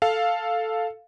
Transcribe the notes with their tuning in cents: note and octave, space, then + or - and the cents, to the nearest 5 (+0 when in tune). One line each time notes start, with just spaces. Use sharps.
A4 +0 F5 +0